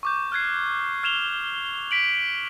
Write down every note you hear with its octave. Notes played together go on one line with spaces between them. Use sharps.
C#6 D6 G6
F6 F#6 G#6 C7
F6 G#6 E7 F7 G7
B6 D7 F#7